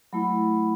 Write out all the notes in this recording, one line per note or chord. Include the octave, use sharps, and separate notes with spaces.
F#3 A3 E4 B5